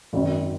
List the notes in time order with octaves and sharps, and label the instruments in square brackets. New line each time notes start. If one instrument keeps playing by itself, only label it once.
[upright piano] G#1 F#2 D#3